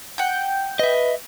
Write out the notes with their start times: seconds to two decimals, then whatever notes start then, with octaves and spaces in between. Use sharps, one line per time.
0.18 F#5 G5
0.79 B4 D#5 E5